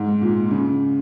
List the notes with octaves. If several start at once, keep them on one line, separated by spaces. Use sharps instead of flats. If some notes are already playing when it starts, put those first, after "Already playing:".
Already playing: G#2
A#2
C#3